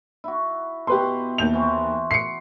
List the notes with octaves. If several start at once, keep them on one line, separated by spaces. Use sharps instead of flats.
E4 F#4
B2 G4 B4 C6
D#2 G6 F7
E3 F#4 C5
C7 C#7